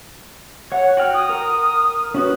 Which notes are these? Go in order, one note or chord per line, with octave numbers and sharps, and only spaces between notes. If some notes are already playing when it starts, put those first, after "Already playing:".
C#5 F#5
F#4 G5 F6
D#6
A#4
C#4 F#4 B4